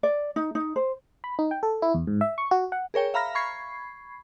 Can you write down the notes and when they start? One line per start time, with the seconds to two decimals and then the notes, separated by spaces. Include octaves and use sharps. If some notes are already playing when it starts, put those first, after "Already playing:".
0.03 D5
0.36 D#4
0.55 D#4
0.76 C5
1.24 B5
1.39 D#4
1.51 G5
1.63 A4
1.82 E4
1.94 E2
2.07 G#2
2.21 E5
2.38 C#6
2.51 F#4
2.72 F#5
2.94 G#4 A#4 C#5 G5
3.14 E5 F5 A#5 B5 F6 A#6
3.35 B5 C#6 G#6 C7